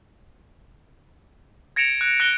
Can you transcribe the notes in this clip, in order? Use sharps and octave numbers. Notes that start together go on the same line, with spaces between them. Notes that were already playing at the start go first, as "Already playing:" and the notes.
G#6 A#6 C#7 D7 E7 F7
F#6
F#6 A#6 D7 G7